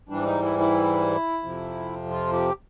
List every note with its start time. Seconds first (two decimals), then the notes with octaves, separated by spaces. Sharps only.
0.09 G#2 E3 G3 D4
0.25 D#4
0.43 E4
0.59 E4
1.43 F2 C3 F3
2.10 F4
2.33 G4